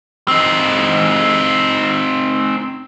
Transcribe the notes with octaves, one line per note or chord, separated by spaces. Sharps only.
C4 D#4